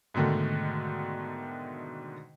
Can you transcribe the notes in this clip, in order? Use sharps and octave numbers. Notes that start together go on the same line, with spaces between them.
G#2 B2 D3 D#3 A3